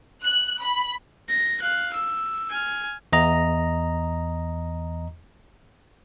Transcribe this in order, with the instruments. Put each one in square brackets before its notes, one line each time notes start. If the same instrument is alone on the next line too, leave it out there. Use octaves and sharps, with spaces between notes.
[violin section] F#6
B5
[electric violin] A#6
F5 F#6
E6
G#5 F6
[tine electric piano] E2 D#5 A#5